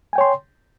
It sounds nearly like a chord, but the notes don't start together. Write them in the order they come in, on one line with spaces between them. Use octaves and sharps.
G#5 G5 C#5 C6